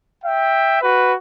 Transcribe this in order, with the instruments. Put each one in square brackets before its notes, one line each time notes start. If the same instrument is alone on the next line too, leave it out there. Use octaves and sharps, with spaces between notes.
[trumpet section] E5 G5
F#4 B4